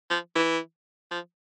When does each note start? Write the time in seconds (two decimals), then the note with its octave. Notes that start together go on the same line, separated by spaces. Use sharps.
0.10 F3
0.35 E3
1.11 F3